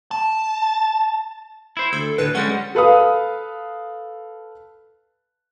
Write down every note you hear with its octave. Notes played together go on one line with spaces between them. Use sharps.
A5
E4 C5
D2 A4
D2 A2 B4
G3 G#3 C#4 F#5
A4 B4 F5 D#6